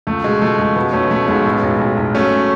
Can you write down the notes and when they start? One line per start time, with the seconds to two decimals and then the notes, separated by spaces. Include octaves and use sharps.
0.07 C#2 A3
0.24 B2 G#3
0.41 B2 A3
0.59 C#2 G#3
0.76 B2 G#3 B3
0.93 B1 A3 C#4
1.11 B2 A3
1.28 B1 G#3 B3
1.46 A2
1.63 B1
1.80 B1
1.97 B1
2.15 F#3 A3 C#4